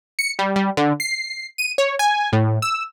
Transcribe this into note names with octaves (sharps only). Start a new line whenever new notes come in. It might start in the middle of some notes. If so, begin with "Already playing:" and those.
C#7
G3
G3
D3
C7
D#7
C#5
G#5
A2
E6